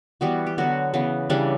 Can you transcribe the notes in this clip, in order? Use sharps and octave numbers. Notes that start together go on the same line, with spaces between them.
E3 G3 B3 F#4
G4
D3 F#3 B3 F#4
C#3 E3 B3
C#3 E3 G3 D4